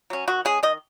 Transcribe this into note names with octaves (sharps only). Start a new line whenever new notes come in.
F#3 C#4
D#3 F#4
G#3 C#4 G#4
D#3 D#5